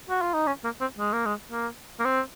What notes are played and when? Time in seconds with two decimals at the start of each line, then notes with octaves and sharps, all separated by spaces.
0.10 F#4
0.22 F4
0.34 D#4
0.47 C#4
0.64 A#3
0.81 C4
0.98 G#3
1.13 A#3
1.26 G#3
1.51 A#3
2.00 A#3
2.05 C4